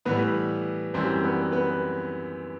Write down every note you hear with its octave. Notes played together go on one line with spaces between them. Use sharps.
A2 E3 G3 B3 B4
F#2 E3 G3 C4 C5
B3 B4
B3 B4